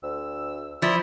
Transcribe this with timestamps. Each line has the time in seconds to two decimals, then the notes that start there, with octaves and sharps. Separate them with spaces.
0.03 D2 E6
0.82 F3 E4 D5 B5